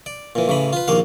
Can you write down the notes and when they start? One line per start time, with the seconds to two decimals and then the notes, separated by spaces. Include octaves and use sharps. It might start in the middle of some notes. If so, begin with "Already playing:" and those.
0.06 D5
0.35 A#2 E3
0.48 A1 C#3 E3 B5
0.73 F4 B4
0.88 A#1 D#2 A#3 F5